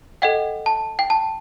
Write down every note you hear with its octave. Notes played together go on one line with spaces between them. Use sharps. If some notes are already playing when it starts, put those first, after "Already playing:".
A4 D#5 F#5 G5
A5
G5
A5